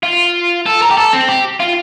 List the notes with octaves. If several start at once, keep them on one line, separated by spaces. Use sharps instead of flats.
F4
A4
A#4
G4
A4
C4
G4
F4